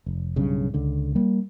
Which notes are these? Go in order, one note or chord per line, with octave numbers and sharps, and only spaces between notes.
F1
B1 G2 C#3
C#2 D3
G3 A#3